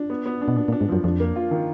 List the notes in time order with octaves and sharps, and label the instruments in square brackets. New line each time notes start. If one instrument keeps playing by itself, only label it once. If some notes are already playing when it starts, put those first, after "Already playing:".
Already playing: [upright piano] D4
B3
B3
D4
[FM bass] B2
[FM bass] A#2 [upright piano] D4
[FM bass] A#2
[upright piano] D4
[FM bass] G#2
[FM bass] F#2 [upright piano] F3
[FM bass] F2 [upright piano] D4
[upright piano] A#3
F4
D#3